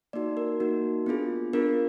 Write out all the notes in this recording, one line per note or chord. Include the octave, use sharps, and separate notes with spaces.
A#3 D#4 F#4 D5
A#4
A#3 D#4 F#4
B3 D4 F4 G#4
B3 D4 F4 G#4 A#4